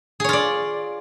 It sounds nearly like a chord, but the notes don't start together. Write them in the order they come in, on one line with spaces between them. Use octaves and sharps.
G#4 C#5 F4 D5